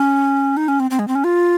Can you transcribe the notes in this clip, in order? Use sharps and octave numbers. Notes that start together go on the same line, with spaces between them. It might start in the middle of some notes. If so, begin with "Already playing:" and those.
Already playing: C#4
D#4
C#4
C4
C4
G#3
C4
C#4
F4